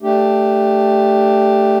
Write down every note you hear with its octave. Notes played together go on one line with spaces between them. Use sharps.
A3 D4 G4